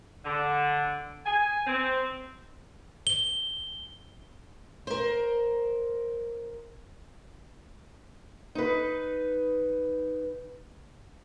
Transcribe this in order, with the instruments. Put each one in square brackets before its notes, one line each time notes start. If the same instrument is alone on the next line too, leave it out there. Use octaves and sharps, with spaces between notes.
[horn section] D3
G#5
C4
[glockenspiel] G7
[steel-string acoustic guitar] A#4 C5
D#4 B4